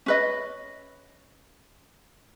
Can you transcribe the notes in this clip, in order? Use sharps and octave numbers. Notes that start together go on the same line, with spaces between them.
C#4 B4 D#5